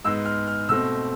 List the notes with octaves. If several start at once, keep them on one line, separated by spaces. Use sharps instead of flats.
G#2 G#3 B3 E6
F6
F6
B2 A3 C4 E6